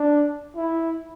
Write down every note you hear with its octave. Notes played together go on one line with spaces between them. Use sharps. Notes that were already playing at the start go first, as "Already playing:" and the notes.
Already playing: D4
E4